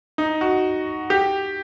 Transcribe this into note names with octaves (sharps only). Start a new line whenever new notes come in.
D#4
F#4
G4